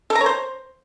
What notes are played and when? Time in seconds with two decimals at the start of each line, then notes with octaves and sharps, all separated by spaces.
0.10 A4
0.15 A#5
0.21 C#5
0.26 C5